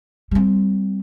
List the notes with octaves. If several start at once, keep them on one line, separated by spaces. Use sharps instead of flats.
G3 C4